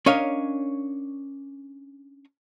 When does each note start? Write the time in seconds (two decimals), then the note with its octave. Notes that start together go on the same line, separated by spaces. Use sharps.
0.06 C#4 D4 A#4 C#5 D#5 F5